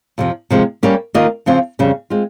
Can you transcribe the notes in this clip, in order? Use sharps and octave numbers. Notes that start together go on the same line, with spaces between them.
F2 C3 F3
C3 F3 G#3
G3 A#3 C#4 G4 C#5
D#3 A#3 F4 A#4 D#5
C#3 F3 C4 F4
F2 C#3 G3 C#4
G#3 C4 F4